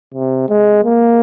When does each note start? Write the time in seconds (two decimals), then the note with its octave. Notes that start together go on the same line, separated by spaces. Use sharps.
0.14 C3
0.49 G#3
0.84 A#3